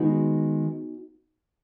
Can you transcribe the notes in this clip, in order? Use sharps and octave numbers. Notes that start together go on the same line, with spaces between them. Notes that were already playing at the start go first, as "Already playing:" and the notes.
Already playing: D#3 G#3 B3 D#4 F#4